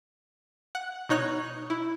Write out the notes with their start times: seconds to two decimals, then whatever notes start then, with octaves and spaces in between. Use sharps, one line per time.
0.75 F#5
1.09 B2 D#4 C#5 F#6
1.70 E4